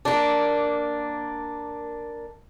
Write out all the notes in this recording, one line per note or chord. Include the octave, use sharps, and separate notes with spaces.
A#3 D4